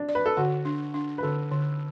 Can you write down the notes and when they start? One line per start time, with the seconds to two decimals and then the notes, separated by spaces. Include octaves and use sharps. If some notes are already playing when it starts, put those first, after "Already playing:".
Already playing: D4
0.09 D5
0.15 B4
0.26 A4
0.37 D3 F#4
0.65 D4
0.94 D4
1.18 B4
1.23 D3 A4
1.52 D3